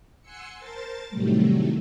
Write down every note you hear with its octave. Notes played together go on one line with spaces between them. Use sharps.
F#5 G#5 C6 E6 C#7
A#4 C5 A5 A6
A2 C3 D#3 F#3 G3 A3